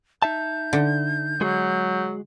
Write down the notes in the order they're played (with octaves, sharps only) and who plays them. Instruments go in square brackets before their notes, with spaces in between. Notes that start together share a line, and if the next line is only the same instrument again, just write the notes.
[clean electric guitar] D#4 E5 A5 [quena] G6
[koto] D3
[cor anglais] F#3 [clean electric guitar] G#3 F#4 G#4